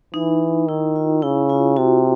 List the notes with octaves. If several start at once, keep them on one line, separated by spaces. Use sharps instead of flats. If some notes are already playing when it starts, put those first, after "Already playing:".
E3 D#4
D#3 E4
F4
C#3 E4
F4
C3 F#4